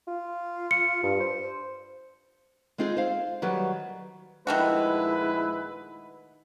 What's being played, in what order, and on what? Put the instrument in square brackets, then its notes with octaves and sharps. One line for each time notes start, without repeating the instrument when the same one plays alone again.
[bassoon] F4
[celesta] C#7
[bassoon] G2
C5
[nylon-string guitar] G#3 C4 D#4 F4 G#4
C5 F5
D#3 F#3 G3 B4
[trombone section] A#1 G#3 B4 [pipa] D#3 A3 F#4 [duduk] E4